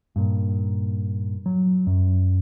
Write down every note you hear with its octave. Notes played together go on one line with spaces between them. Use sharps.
G2 A#2
F#3
F#2